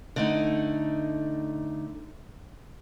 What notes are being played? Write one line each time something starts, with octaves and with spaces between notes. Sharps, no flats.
D3 A3 D#4